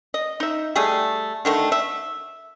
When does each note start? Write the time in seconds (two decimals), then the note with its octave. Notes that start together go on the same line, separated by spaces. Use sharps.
0.14 D#5
0.40 D#4 E5
0.76 G3 A3 G#4
1.45 D3 D#3 A3
1.72 E5